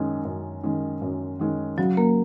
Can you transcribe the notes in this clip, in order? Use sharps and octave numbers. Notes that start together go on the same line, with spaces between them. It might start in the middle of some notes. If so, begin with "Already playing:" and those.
Already playing: F#2 D#3 G#3 C#4
F#2
D#3 G#3 C#4
F#2
D#3 G#3 C#4
C#3 F#3 F#4
A#3 A#4